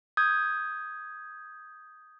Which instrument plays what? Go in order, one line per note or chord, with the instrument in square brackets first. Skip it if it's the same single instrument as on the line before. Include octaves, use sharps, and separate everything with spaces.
[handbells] D#6 G6 G#6